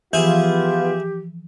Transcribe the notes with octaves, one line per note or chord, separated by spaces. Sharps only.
E3 F3 B3 E4 F4 G4 G#4